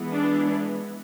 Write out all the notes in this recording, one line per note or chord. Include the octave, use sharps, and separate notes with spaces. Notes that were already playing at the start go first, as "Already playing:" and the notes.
Already playing: E3 G#3 B3
D4